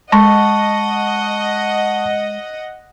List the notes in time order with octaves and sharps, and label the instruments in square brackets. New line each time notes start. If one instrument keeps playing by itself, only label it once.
[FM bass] G#3 [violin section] D#5 F#5 [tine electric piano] A5 C#6